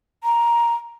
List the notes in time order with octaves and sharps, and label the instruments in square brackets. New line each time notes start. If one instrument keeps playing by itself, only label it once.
[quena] A#5